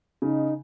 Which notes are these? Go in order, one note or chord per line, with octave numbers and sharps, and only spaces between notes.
C#3 D#4